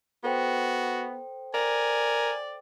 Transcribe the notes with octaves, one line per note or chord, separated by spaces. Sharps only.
B3 F#4 A4 C5 G5
A#4 D5 G#5